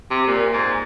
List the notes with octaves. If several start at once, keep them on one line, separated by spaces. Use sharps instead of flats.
C3
A#2
G#2